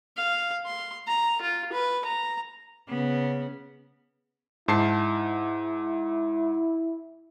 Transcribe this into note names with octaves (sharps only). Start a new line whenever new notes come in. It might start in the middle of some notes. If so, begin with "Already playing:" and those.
F5
C6
A#5
F4
B4
A#5
C#3 B3
G#2 E4 A5 C7